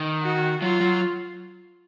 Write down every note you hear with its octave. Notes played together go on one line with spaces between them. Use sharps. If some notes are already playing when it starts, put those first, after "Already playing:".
Already playing: D#3
F#4
F#3 F4
F#3